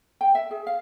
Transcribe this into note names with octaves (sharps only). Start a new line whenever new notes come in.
G5
E5
G#4
F5